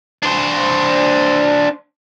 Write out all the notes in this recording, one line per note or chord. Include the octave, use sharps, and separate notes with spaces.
D4 C5